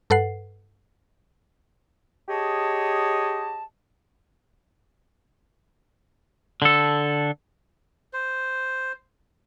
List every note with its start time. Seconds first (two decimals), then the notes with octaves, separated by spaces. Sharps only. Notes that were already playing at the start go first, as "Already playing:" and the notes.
0.10 G2 A4 B4 F#5 C7
2.29 G4 G#4 C#5 D#5 A5
6.62 D3 A4
8.13 C5